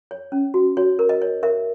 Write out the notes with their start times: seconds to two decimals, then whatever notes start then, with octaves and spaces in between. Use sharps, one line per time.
0.11 C#5
0.32 C#4
0.54 F#4
0.77 F#4 C#5
0.99 A#4
1.09 D#5
1.22 C#5
1.43 A#4 E5